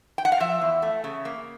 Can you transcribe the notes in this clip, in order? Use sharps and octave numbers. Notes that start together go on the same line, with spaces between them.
G5
F#5
F5
F3 E5
E2
A3
C#3
A#3